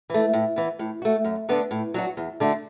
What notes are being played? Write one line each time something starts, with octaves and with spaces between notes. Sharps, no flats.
E3 A3
A2
E3 B3
A2
A3 F#4
F#2
D3 B3 D4
A2
F#3 D4 F#4
E2
D3 A3 D4 F#4